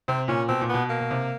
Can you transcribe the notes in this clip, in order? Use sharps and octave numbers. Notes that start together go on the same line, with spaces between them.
C3 C4
A#2 C#4
B2 C4
A#2
B2 B3
A#3
B2
C3